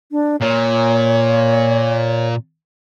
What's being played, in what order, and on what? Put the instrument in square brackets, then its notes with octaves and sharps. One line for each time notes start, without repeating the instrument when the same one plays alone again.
[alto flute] D4
[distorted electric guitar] A#2 [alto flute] C#5